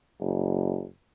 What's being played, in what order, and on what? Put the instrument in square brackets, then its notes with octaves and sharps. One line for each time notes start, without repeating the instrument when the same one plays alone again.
[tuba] F#1